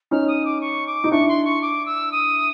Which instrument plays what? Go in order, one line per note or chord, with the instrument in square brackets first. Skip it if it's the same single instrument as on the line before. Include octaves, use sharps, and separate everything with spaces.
[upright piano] C#4 D#4 [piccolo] F6
[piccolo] D#6
D6
C#6
D6
[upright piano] D#4
[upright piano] D4 E4 [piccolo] C#6
[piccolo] C6
C#6
D6
E6
D#6